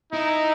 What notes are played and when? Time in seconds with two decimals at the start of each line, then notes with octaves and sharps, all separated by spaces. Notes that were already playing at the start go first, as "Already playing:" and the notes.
0.12 D#4 E4